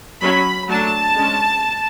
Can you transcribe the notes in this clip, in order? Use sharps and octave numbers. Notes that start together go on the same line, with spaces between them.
F#3 C#4 B5
F#3 A3 D4 A5
G#3 C#4